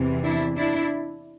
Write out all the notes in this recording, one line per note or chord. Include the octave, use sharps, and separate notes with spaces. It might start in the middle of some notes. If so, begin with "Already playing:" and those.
Already playing: E2 C3 E3
D4 E4
D4 E4